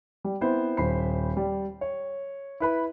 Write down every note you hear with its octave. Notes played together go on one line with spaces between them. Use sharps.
G3
B3 C4 E4 C5
D#1 C5 B5 C7
G3
C#5
E4 B4 B5